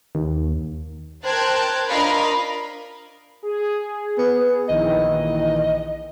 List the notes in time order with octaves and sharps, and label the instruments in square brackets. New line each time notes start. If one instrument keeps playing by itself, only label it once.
[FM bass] D#2
[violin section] A#4 C5 G5 A5 F#6 G#6
D4 F4 A#4 D#5 F5 B5
[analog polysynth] G#4
[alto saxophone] B3
[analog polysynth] A#1 D#3 E3 [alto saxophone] D#5